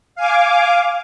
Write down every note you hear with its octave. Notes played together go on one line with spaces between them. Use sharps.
F5 G#5 D6